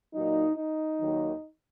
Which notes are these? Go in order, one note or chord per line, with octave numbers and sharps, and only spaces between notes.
A#2 F#3 D#4
D#4
D#2 D#3 F#3